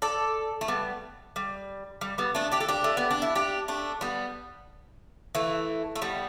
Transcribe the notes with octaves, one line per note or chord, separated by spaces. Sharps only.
A4 D5
A3
G3 B3
G3
G3
G3 B3
A3 D4
D4 G4
A4
D4 G4
A3
B3
D4
E4
D4 G4
A3 D4
G3 B3
E3 A3
A3
G3 B3